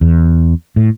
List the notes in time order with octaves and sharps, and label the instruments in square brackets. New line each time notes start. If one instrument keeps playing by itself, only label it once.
[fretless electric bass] E2
A2